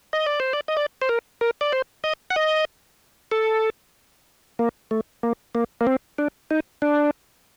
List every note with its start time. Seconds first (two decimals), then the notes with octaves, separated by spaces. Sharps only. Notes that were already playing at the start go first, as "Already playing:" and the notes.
0.13 D#5
0.26 D5
0.40 C5
0.53 D5
0.68 D#5
0.77 D5
1.02 C5
1.09 A#4
1.41 A#4
1.61 D5
1.72 C5
2.04 D#5
2.30 F#5
2.36 D#5
3.32 A4
4.59 A#3
4.91 A3
5.23 A#3
5.55 A#3
5.81 A#3
5.87 C4
6.18 D4
6.51 D#4
6.82 D4